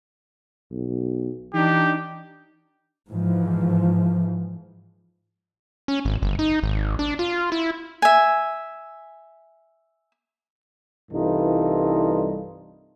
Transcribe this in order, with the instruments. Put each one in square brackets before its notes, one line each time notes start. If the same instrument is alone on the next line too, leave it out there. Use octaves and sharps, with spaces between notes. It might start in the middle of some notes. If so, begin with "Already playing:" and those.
[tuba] B1
[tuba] E3 [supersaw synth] D4 D#4 [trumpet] G4
[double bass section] G#2 E3 F3
[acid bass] C#4
G#1
G1
D#4
G#1
D4
F4
E4
[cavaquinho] E5 G#5
[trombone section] C2 G2 E3 D#4 F4 A4